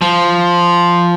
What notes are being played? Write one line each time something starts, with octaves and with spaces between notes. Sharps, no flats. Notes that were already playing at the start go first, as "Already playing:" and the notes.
F3